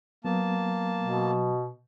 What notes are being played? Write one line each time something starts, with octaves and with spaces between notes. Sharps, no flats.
F#3 A#3 B3 A5
B2